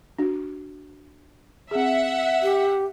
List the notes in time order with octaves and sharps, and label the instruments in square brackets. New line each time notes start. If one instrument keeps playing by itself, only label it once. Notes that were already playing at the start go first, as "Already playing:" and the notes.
[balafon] D4 F#4
[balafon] C4 G#4 [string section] E5 F#5
[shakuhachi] G4